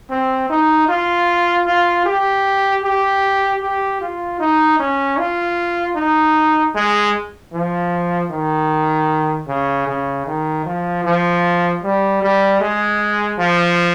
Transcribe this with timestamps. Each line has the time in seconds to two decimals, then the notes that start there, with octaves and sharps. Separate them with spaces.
0.10 C4
0.50 D#4
0.89 F4
1.66 F4
2.06 G4
2.83 G4
3.62 G4
4.01 F4
4.40 D#4
4.79 C#4
5.18 F4
5.96 D#4
6.75 G#3
7.53 F3
8.31 D#3
9.48 C#3
9.87 C#3
10.27 D#3
10.66 F3
11.04 F3
11.83 G3
12.22 G3
12.61 G#3
13.39 F3